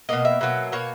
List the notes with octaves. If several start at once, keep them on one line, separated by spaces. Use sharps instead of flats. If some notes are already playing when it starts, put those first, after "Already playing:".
B2 A#3 D#5
E5
B2 F#3 A#3
B2 A#3 C#5